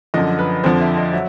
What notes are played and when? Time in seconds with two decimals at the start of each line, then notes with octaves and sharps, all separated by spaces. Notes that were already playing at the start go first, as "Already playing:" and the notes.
0.14 F#2 D3 F3 D#5
0.39 B4
0.64 F2 D3 F3 C5
0.81 E5
0.97 D#5
1.13 F#3 E5